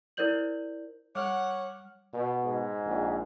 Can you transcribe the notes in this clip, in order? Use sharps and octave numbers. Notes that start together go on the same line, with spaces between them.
E4 A#4 C5 D5 G6 F#7
G3 C#5 F#5 D6 F6
B2
G#2
A#1